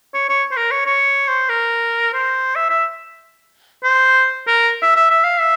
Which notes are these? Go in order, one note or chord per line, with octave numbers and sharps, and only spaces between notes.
C#5
C#5
C5
A#4
C#5
C#5
C5
A#4
C5
E5
E5
C5
A#4
E5
E5
E5
F5
E5